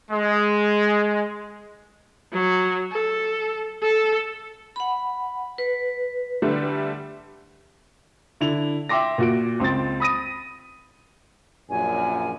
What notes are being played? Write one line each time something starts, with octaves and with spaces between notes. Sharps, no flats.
G#3
F#3
A4
A4
F#5 B5
B4
D3 G3 A3
D3 E4 F7
E5 G5 C6 D6 A#6
A#2 F#4 D7
C#2 C4 C6 A6
B5 D#6 A#6 D#7
A#1 F#2 A#2 G#5